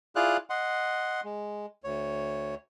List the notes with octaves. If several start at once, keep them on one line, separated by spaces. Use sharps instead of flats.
E4 F4 G#4 D5 F5 F#6
D#5 F#5 C6
G#3
D2 C#5